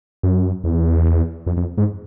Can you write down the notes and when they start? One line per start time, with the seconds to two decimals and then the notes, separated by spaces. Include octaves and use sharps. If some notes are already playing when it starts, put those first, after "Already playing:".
0.23 F#2
0.64 E2
1.47 F2
1.57 F2
1.78 G#2